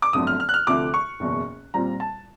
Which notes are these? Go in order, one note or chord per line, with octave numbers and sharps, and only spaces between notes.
D6
G1 F2 D3 F#3 A3 D#6
F6
F6
F#6
F6
D2 C3 F3 A3 D6
C#6
F#1 E2 B2
A#2 G3 C4 F4 A#5
A5